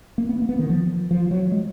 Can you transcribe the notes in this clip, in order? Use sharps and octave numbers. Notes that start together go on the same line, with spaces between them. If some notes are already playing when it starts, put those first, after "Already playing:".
A#3
B3
A#3
B3
D#3
F3
F3
F#3
G#3